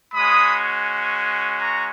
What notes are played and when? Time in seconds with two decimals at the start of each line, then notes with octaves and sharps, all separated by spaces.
0.14 G#3 C#4 F#4 B5 D#6
1.60 A#5 C#6